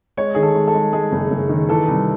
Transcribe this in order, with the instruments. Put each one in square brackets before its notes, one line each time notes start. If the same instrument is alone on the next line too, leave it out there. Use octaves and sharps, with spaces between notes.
[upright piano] G#3 C#5
D#3 G#4
A4
G#3
A4
G#3
G#3 G#4
F#1
F#1
D#3
E3 A4
C2